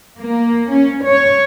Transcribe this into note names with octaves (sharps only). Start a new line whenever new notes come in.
A#3
C#4
C#5